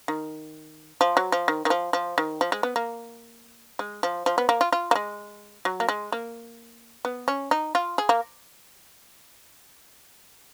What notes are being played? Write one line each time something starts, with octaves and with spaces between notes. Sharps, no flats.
D#3
F3
F#3
F3
D#3
D#3
F3
F3
D#3
F3
G#3
B3
A#3
G#3
F3
F3
B3
A#3
F4
F4
A#3
G#3
F#3
A#3
G#3
A#3
B3
C#4
D#4
F4
G#4
A#3